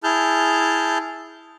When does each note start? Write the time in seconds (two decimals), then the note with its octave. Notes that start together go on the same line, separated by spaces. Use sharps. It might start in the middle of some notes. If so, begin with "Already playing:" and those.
0.04 E4 G#4 A5 F6 G6